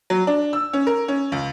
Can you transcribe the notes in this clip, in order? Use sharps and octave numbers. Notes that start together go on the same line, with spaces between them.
F#3
D4
E6
C#4
A#4
C#4
C#2